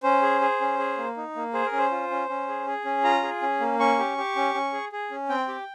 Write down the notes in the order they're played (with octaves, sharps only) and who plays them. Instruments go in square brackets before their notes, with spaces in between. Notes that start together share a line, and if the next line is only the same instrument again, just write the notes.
[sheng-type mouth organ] C#4 C5
G#4
G#4
C#4
G#4
A#3
D#4
A#3
G#4 C5
A#4
C#4
C5
F4
C#4
C#4
G#4
G#4
C#4
F4 A#5
G#4
C#4
A#3
C#4 C#6
G4
G4
C#4
C#4
G#4
G#4
C#4
C4 G5
G4